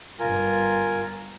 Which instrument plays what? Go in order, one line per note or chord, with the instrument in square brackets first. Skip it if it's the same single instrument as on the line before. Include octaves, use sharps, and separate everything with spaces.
[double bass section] G1 G2 G3 [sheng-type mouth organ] F4 A#4 G#5